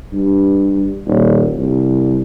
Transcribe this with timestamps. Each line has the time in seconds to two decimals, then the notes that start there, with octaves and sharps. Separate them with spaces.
0.13 G2
1.07 D#1
1.56 C2